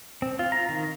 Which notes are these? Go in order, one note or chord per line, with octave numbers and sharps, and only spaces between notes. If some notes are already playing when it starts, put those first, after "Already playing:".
C4
F4
A#5
D#3